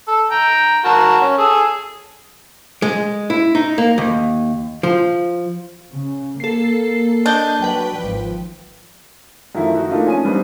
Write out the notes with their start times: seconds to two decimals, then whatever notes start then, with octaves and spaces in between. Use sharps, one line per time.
0.08 A4
0.31 G5 A#5
0.84 F#4 A#4 A5
1.21 C#4
1.38 G#4 A4
2.82 G#3
3.30 E4
3.55 D#4
3.78 A#3
3.98 D#2
4.83 F3
5.91 C#3
6.40 A#3 A4 C7
7.26 D4 D#5 G6 G7
7.62 F#3 B4 G5
7.98 G#1 F3
9.55 F#2 D#3 F3 A3 E4
9.75 D#4 F#4
9.90 A3 A#3 D4 D#4 F4
10.05 F3 C#4 G#5 D#6 D#7
10.25 G3 G#3 B3 C4 D4 D#4